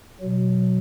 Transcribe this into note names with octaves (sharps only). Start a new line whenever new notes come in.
B2 F#3